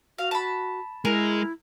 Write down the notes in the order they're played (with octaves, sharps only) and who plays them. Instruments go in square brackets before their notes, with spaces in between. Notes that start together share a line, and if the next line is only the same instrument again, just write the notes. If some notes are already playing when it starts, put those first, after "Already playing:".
[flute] F#4 [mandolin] F5
[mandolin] A5 B5
[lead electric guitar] G#3 [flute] E4 [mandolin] A#4